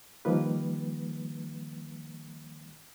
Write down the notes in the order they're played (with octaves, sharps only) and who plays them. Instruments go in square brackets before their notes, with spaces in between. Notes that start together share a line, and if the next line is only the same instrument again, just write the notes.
[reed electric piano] D#3 F3 G3 A#3 B4